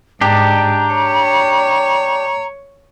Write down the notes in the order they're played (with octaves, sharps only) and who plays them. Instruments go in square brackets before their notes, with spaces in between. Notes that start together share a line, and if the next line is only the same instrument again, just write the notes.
[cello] G#2 [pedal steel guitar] D4 G4 [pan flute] A#5
[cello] C#5